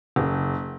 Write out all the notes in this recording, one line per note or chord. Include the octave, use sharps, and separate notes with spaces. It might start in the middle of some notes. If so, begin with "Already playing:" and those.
F#1